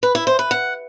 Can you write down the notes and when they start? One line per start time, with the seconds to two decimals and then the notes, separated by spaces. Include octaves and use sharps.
0.03 B4
0.15 E4
0.27 C5
0.39 B4
0.51 F#5